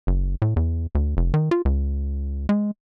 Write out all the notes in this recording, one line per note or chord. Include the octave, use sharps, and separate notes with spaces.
F#1
A2
E2
D2
F1
D#3
F4
C#2
G#3